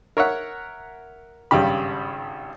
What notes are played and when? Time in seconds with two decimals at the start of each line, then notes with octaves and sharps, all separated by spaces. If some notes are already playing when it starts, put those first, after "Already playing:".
0.17 A#4 C#5 E5 F#5
1.51 G#1 G2 C#3 G4 B5